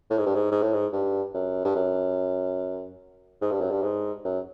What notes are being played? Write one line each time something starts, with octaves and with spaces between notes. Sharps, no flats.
A2
G#2
G2
G#2
G#2
A2
G#2
G2
F#2
G2
F#2
G#2
G2
F#2
G2
G#2
F#2